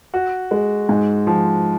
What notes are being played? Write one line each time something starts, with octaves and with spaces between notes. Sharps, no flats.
F#4
G#3
G#2
F3